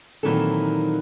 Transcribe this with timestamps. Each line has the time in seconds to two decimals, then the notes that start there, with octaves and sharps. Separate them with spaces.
0.23 A#2 D#3 E3 F#3 C4 A4